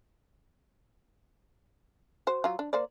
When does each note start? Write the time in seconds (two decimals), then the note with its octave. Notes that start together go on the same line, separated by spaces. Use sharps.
2.27 F#4 C5
2.44 F#3 F4
2.59 D4
2.73 A#3 C5 D5